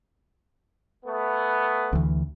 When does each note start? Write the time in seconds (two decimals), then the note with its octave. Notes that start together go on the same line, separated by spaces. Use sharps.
1.05 A3 B3
1.93 D2 E3